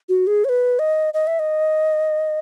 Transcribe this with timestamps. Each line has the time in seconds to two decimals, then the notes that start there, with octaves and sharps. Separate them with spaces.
0.09 F#4
0.27 G#4
0.45 C#5
0.49 B4
0.79 D#5
1.14 D#5
1.27 E5
1.39 D#5